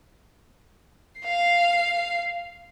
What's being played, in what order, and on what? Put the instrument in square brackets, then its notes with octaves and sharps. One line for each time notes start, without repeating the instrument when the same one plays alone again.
[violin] F5 C7